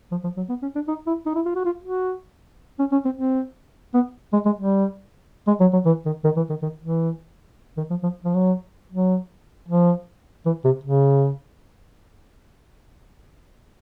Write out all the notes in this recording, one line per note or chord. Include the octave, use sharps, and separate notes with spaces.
F3
F3
F#3
B3
C#4
D4
D#4
E4
D#4
E4
F4
F#4
F4
F#4
C#4
C#4
C4
C4
B3
G#3
G#3
G3
G#3
F#3
F#3
E3
D#3
D#3
E3
D#3
D#3
E3
D#3
F3
F3
F3
F#3
F#3
F3
E3
C3
C#3